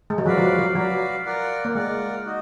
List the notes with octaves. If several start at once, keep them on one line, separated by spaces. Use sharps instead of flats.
G#3
F#3
F3 F#4 B4 D5 F5
F3
F#3
F#3
F#3 F#4 B4 D5 F5
F4 A#4 D5 F#5
A#3
G#3 F4 A#4 D5 F#5
D#4 F#4